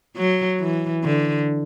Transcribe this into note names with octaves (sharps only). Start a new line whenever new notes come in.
F#3
E3
D3